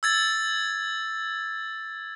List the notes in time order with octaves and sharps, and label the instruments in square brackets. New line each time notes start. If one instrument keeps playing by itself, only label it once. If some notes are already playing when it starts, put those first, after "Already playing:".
[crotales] E6 G#6 A6